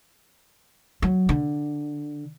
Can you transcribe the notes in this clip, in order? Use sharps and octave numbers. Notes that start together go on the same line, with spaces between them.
F#3
D3